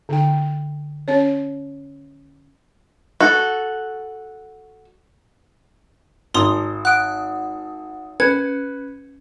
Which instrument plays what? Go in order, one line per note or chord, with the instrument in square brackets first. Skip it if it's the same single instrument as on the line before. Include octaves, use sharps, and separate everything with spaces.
[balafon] D3 G5
C#4 C#5
[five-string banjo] F#4 A4
[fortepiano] G#1 [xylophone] A#5 C6 D#6
[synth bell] F#5 D#6 [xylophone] F#6 D7
[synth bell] C#4 [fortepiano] B4 [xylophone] G#6